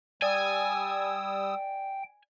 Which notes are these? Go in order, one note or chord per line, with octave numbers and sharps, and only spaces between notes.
G3 D5 G5 G#5 D#6 E6